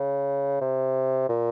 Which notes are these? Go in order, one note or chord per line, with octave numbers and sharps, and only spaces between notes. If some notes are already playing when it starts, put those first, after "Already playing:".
Already playing: C#3
C3
A#2